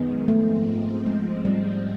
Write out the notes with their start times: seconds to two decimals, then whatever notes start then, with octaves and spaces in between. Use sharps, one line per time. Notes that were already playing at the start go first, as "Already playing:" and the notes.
Already playing: F#2 D#3 G#3 B3
0.28 G#2 F3 G#3 A3 C4
1.06 G#3
1.45 G3